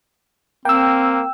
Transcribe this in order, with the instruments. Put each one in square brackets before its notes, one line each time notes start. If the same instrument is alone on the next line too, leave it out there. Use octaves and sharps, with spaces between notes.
[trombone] A#3 [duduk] C4 [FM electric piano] G5 E6